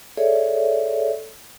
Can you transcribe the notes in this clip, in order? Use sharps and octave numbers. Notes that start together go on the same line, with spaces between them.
G#4 A4 C#5 D5 E5